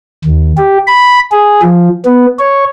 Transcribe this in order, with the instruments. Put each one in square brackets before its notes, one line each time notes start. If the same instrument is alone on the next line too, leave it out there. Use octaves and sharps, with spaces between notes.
[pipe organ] D#2
G4
B5
G#4
F3
B3
C#5